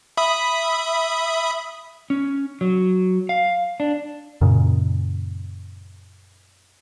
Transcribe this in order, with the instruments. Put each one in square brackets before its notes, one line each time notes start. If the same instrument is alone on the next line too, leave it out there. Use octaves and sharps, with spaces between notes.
[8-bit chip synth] E5 B5 D#6
[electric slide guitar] C#4
F#3
F5
D4
[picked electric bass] F#2 A#2 C#3